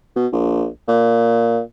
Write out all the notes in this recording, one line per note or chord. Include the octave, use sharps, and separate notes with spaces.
B2
A#1
A#2